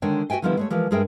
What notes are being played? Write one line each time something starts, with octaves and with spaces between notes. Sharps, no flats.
D3 D#3 G#3 D4 C#5 G5
F#4 C5 E5 G5 G#5
D3 D#3 F3 G3 B3 E4
G#3 A3 C#5
E3 F3 G#3 A#4
G2 G#3 G#4 A#4 E5 G5